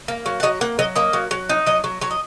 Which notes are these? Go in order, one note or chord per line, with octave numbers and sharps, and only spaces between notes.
A#3
F#3
F#5
F#3 D#5
A#3 F#5
F#3 D#5
A#3 D#5
F#3
F#3
D#4
F#3 D#5
F#3
F#3 C#5
D#5